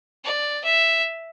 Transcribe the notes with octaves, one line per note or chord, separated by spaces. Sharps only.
D5
E5